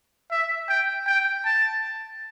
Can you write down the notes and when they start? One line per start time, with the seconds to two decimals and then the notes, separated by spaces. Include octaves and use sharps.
0.31 E5
0.69 G5
1.07 G5
1.45 A5